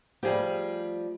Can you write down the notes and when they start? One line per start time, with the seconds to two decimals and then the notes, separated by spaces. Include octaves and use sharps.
0.23 F3 G3 A3 G4 G#4